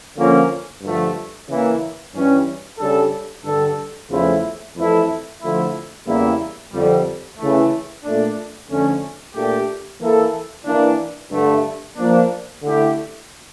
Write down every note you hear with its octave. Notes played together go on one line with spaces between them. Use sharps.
D3 F3 A#3 C#4 F4
G2 D3 F3 A3
C#3 E3 A#3 E4
G2 E3 G3 C#4
C#3 G3 D4 A4
G2 D3 G3 D4 A4
E2 C#3 F3 A3 E4
F2 E3 A3 E4 A4
D3 F3 A3 E4
E2 C#3 G3 A#3 E4
F2 D3 G3
C#3 E3 A3
A#2 A3 D4
F2 D3 A3 C#4
A#2 A3 D4 G4
E3 A#3 E4 A4
E3 A#3 D4
G2 D3 A3
F3 A#3 D4
D3 A3 E4 G4